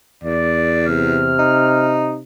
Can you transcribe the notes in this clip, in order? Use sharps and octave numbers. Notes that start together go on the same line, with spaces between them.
E2 D5
C3 F6
D#4